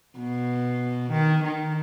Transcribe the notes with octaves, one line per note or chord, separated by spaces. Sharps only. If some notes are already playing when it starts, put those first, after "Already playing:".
B2
D#3
D#3